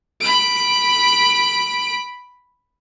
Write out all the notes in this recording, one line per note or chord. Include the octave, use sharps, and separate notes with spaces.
B5 D7